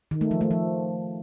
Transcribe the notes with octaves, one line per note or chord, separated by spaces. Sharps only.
D#3
A3
F3
A3
F3